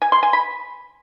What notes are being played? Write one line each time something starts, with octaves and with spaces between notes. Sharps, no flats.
G#5
C6
G#5
B5